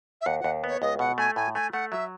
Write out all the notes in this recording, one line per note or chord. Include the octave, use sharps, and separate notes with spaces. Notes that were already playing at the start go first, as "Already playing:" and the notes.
E5
D#2 F#5
D#2 F#5
B3 C#5
C#2 D#5
B2 F#5
A3 G#5
A2 G#5
A3 G#5
A3 F#5
F#3 E5